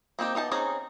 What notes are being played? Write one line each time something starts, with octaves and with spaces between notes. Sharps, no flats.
A#3 C4 D#4 G4
B3 D#4 F5 A5
C4 C#4 D#4 G#4 A#5